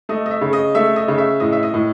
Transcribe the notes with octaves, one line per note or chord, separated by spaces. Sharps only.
A3 D#5
D#5
E5
C#3
D#5
A3 E5
D#5
C#3
E5
A2 D#5
E5
D#5
A2